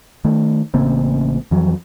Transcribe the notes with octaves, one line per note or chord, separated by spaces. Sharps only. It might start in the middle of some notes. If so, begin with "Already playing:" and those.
D#3 A3
A1 C#3 A#3 C4
F2 E3 F#3